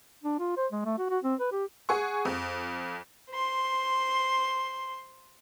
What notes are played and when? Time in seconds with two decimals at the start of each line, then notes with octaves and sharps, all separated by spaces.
0.24 D4
0.39 F4
0.57 C5
0.72 G#3
0.85 A3
0.98 F#4
1.10 F#4
1.23 C4
1.40 B4
1.51 G4
1.89 G#4 F#5 C#6
2.25 F2
3.30 C5 C6